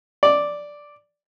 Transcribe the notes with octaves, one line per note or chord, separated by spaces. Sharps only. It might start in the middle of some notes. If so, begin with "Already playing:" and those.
D5